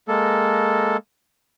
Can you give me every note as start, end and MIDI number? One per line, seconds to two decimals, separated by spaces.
0.08 0.97 56
0.08 0.97 58
0.08 0.97 69